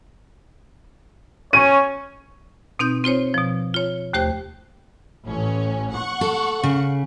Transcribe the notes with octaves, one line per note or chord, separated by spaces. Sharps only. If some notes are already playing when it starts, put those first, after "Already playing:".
C#4 C#5 D#7
B2 C4 D#4 G6
C4 F4 C5 C#5
B2 F3
F4 C#5
D#2 A3 G4 C5 G5 F#6
A1 C#4
F#5 C#6
A4
C#3